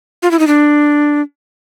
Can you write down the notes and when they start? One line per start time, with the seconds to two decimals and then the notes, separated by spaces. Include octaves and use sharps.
0.23 F4
0.31 E4
0.39 D#4
0.47 D4